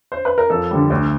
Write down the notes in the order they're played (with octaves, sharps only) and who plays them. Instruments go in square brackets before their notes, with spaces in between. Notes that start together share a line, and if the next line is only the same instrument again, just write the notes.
[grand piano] C5
B4
A#4
F2 A4
D3 G3
D2